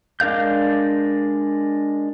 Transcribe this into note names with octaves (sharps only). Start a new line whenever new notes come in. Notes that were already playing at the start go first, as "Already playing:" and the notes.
G#3 D4 A#4 F5 G6